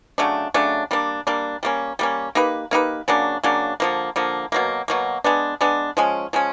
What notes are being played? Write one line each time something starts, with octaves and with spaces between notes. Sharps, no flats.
C#3 F#3 A3 D4
C#3 F#3 A3 D4
G3 A#3 D4
G3 A#3 D4
G3 A#3 C#4
G3 A#3 C#4
A#3 D#4 G4 B4
A#3 D#4 G4 B4
C#3 F#3 A#3 D4
C#3 F#3 A#3 D4
D3 F3 A#3
D3 F3 A#3
B2 F#3 A#3
B2 F#3 A#3
G#3 B3 D4
G#3 B3 D4
F3 G#3 C#4
F3 G#3 C#4